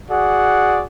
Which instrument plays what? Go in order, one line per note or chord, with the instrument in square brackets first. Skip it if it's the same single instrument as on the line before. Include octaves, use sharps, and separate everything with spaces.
[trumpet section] F#4 G#4 D5 F#5